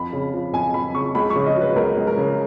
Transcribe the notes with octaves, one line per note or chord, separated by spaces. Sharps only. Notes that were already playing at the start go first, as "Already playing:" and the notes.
Already playing: F2 F3 B5
C#3
F3
F2 G#5
F2 B5
C#3 C#6
C#2 B5
C#6
C#3
D#5
F#3 B4
C#2 A#4
C#2
A#4
C#3